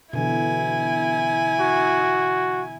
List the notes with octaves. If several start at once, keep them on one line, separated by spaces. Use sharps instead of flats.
B2 D3 E3 E4 G#5
F#4